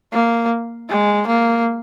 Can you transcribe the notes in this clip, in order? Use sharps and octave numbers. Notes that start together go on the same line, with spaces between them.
A#3
G#3
A#3